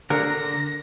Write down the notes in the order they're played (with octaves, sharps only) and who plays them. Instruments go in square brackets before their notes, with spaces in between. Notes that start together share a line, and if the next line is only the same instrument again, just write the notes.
[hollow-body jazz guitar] D3 [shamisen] A#4 [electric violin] A#6